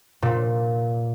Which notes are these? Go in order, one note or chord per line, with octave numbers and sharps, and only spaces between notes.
A#2